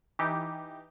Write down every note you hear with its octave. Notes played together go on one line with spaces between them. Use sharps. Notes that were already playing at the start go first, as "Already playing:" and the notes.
E3 D#4 G4